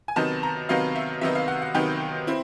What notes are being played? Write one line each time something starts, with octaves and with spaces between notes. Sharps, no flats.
G#5
C3 D#3 F#3 B3 D#4 A5
A#5
C3 D#3 F#3 B3 D#4 F5
E5
C3 D#3 F#3 B3 D#4 E5
F5
F#5
F#5
C3 D#3 F#3 B3 D#4 G5
C4 E4